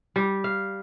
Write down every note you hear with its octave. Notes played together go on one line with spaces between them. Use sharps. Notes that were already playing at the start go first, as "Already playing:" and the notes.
G3
F5